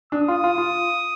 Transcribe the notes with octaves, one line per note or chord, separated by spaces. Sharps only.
D4 D#6
F4
F4
F4